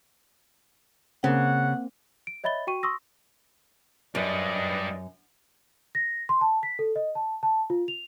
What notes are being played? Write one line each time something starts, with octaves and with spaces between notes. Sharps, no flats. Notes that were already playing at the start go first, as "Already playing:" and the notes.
C#3 A#3 C4 F#5
D7
C#5 D#5 E5 B5 A6 G7
F#4 G5 C#6 D#7
C6 C#6 D#6 E6 A#6
F#2 G3 B4 D5 D#5
A#6
C6
A5
B6
A4
D#5
A5
A5
F4
F7